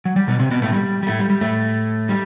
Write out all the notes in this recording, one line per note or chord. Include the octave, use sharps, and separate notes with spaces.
F#3
G3
B2 B3
C3 C4
B2 B3
A2 A3
G3
G3
A2 A3
G3
G3
A2 A3
G3